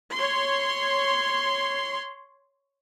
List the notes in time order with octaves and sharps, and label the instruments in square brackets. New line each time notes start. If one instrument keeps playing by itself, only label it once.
[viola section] C#5 C6